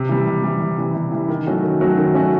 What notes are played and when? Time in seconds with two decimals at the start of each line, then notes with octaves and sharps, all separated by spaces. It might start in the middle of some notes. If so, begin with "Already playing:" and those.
Already playing: C3
0.09 E3 G3
0.27 C3
0.43 E3 G3
0.60 C3
0.78 E3 G3
0.95 C3
1.11 E3 G3
1.29 D#3
1.47 F#3 A3 C#4 F#4
1.63 D#3
1.81 F#3 A3 C#4 F#4
1.97 D#3
2.14 F#3 A3 C#4 F#4